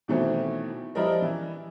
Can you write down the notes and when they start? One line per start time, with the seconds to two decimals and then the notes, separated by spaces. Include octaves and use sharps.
0.08 B2 D#3 E3 F#3 A3 C4
0.95 F3 G3 E4 A#4 D#5
1.21 E3 E4